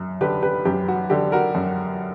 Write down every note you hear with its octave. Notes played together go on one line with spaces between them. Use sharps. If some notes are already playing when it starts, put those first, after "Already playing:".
Already playing: F#2
D3 G4 B4
G4 B4
F#2 G4
F#4
D3 G4
F#4 A#4
F#2